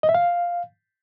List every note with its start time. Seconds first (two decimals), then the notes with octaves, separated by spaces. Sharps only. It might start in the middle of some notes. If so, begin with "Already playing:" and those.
0.03 D#5
0.09 E5
0.14 F5